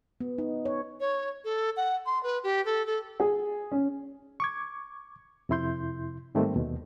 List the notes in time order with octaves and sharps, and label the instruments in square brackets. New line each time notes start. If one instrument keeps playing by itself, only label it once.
[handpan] B3
D#4
C#5
[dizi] C#5
A4
F#5
C6
B4
G4
A4
A4
[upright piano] G#4
C#4
[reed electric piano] C#6 D6 G#6
F2 C3 E4 C6 G6
G#2 D#3 G3 A3 A#3 C4
D#2 B2